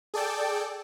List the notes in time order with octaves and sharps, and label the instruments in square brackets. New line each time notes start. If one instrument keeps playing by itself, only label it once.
[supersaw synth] G#4 A4 D5 G5 A5